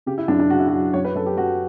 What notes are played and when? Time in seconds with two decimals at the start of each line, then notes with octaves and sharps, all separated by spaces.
0.06 C#3 G4
0.18 E4
0.28 F#2 D4
0.39 D4
0.50 C#3 F#4
0.59 E4
0.68 F#4
0.73 F#3
0.94 F#2 C#5
1.05 B4
1.15 F#2 A4
1.26 G4
1.37 F#2 F#4